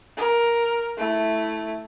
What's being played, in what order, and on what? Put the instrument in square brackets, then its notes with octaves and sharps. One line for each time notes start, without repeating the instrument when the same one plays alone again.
[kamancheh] A#4
A3 E4